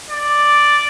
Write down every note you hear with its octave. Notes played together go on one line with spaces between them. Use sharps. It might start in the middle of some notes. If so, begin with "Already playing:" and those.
D5